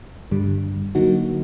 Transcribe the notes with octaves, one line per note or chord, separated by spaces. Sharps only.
G2 D3 G3
D3 F#3 A#3 D#4 F#4